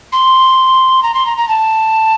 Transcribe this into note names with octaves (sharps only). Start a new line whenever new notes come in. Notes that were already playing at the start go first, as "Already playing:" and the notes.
C6
A#5
C6
A#5
A#5
A5